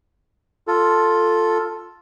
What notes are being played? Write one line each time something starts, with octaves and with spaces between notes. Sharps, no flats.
F4 A4